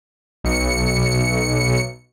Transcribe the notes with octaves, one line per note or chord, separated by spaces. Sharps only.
B1 C#7